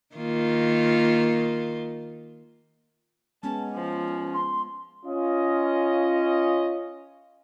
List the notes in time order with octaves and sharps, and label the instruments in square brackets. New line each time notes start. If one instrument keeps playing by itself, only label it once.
[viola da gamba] D#3 A#3 F4
[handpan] G#3 B3 [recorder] C#4 [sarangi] A5
[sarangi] F3
[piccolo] C6
[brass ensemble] C#4 F4 D#5